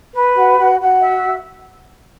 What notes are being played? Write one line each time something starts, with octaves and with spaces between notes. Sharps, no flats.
B4
F#4
F#4
F#4
E5